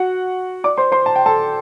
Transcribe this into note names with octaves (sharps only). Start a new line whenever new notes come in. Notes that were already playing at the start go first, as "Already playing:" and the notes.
Already playing: F#4 F#5
D5 D6
C5 C6
C5 C6
A5
G5
A4 A5